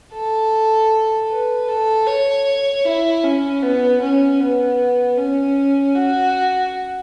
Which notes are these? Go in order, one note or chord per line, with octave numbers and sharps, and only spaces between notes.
A4
B4
A4
C#5
E4
C#4
B3
C#4
B3
C#4
F#4